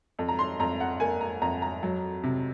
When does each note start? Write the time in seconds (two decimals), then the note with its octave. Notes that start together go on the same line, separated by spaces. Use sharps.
0.19 F2
0.28 A#5
0.39 C6
0.60 F2 A#5
0.80 F#5
1.00 A#3 G#5
1.21 A#5
1.42 F2 A#5
1.62 A#5
1.83 F#3
2.23 C3